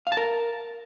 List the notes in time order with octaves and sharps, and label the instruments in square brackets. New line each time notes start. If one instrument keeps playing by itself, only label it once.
[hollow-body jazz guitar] F5
A5
A#4